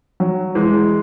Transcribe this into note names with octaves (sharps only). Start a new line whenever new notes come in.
F#3
E3 G#3